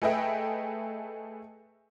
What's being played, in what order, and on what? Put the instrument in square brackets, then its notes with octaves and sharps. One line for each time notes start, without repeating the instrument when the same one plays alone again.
[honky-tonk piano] A3 G#4 B4 D#5 E5 G5